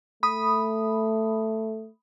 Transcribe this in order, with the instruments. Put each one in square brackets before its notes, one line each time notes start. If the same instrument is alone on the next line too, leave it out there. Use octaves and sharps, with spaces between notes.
[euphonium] A3 [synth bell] B5 D#6